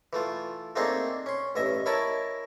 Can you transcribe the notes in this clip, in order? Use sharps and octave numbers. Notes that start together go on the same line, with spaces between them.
E3 A3 F4
A3 A#3 C4 D4 D#4 G#4
C#4 C6
A1 G2 D#5 E5
E4 A#4 C#5 D#5 A5 B5